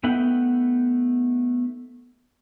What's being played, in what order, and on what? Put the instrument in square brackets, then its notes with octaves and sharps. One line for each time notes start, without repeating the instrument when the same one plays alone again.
[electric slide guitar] A3 B3 D#4 E5 F#5 G5